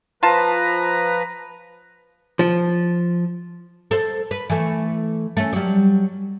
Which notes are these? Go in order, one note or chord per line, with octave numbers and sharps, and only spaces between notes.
F3 F4 B4 A5 A#5
F3
A4 C5
B4
E3 A3
A3 C#4
F#3 G3